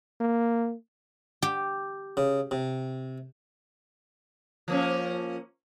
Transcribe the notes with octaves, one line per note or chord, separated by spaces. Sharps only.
A#3
G4
C#3
C3
F3 A#3 C#4